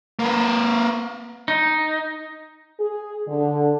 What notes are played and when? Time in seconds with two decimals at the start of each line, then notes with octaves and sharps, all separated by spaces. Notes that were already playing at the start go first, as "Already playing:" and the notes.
0.19 A#3 B4
1.48 D#4
2.79 G#4
3.28 D3